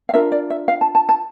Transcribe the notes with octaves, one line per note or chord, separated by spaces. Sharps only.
F5
D4 F4 A#4 E5
D5
E5
F5
A5
A5
A5